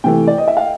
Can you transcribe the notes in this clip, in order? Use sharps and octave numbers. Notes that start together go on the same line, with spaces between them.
C3 E3 A3 G5
D5
D#5
E5
F5